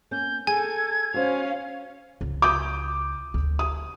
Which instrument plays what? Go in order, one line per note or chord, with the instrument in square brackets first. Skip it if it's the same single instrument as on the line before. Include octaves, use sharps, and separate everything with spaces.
[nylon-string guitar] A#3 C#4 [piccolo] G6
[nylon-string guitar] G#4 [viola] A4 [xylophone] G#5 [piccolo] G#6
[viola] C#4 F5 [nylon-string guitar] F#4 C5
[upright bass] C#2
[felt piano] D6 D#6 G6
[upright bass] D2
[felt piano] D#6